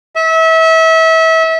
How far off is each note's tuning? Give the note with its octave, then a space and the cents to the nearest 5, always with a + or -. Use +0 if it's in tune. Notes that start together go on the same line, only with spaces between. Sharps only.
E5 -30